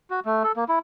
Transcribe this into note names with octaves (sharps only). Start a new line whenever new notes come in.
F#4
A3
A4
A#3
E4